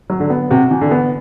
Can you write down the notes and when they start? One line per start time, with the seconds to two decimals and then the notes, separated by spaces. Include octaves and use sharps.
0.10 F#3
0.20 D3
0.30 B3
0.51 C3 F#4
0.71 E3
0.81 D3
0.91 B3